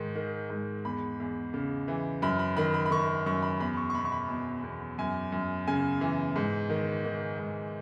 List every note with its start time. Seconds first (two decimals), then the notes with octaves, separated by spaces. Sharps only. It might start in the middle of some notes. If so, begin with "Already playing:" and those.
Already playing: G#2 D#3
0.15 D#3
0.50 G#2
0.85 E2 B5
1.20 E2
1.54 C#3
1.88 E3
2.22 F#2 B5
2.39 B5
2.57 D#3 B5
2.74 B5
2.86 B5
2.91 D#3 C#6
3.26 F#2 C#6
3.43 B5
3.60 E2 B5
3.77 C#6
3.90 C#6
3.95 B2 B5
4.05 C#6
4.12 B5
4.29 B2
4.63 E2
4.98 F#2 G#5
5.32 F#2
5.68 C#3 G#5
6.01 E3
6.36 G#2
6.70 D#3
7.05 D#3
7.39 G#2